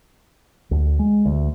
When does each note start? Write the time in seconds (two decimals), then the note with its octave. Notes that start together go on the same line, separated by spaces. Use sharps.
0.71 D2
0.99 G#3
1.26 D2